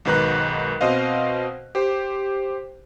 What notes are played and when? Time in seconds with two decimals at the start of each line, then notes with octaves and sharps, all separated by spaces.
0.05 B1 G#2 D#3 B4 A#5 F#6
0.81 B2 C4 C5 D#5 F5
1.75 G4 C5